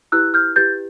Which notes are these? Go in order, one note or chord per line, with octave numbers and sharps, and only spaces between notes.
E4 G4 B4 E6 F#6
F6 G6
E4 G4 B4 G6 A6